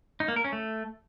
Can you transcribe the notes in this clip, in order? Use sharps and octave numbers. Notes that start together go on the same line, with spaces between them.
D#4
A#3
A#4
C#4
A3